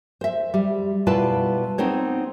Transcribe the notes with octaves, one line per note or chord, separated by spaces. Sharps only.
C5 E5
G3
B2 G3 E4 F4 B4 A5
B3 C4 D#4 C5 C#5